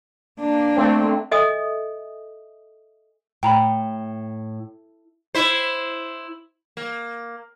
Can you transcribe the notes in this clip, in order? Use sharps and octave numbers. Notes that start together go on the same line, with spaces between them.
A#3 D4
A3 C4
A4 D#5 E5 G#5 D#6
A2 G5 A#5 B5
E4 C5
A#3